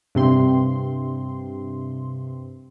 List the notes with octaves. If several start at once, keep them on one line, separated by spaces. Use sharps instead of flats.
G2 C3 C4 C6